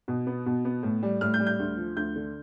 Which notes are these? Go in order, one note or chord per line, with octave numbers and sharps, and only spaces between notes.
B2
B3
B2
B3
A2
G3
A2 F6
G6
G3
G6
D2
F3
D2 G6
D3